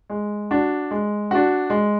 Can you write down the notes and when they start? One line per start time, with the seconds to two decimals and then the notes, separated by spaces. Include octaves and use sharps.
0.10 G#3
0.51 D4 F#4
0.91 G#3
1.31 D4 F#4
1.70 G#3